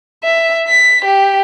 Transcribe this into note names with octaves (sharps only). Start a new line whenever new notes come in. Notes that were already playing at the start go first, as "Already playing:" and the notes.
E5
B6
G4